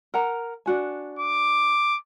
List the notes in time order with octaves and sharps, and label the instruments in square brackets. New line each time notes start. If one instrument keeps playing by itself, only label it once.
[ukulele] A#4 F#5 A#5
D4 F#4 G#5
[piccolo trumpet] D6